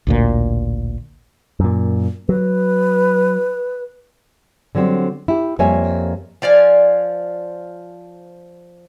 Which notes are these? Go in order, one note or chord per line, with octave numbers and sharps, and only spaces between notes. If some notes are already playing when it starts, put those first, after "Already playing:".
A1 D2 A#2
F#2 A#2
F#3 B4
D3 F#3 G3 C4
E4 G4
F2 G3 A#3 C#5 E5 G#5
F3 D5 F5 G#5